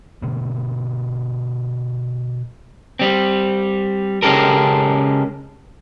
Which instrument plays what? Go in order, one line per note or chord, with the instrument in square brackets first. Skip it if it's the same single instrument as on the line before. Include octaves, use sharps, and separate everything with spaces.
[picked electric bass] B2 D3 A#3
[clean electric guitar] G3 C4
C#3 G#3 C#4 G4 A4 A#4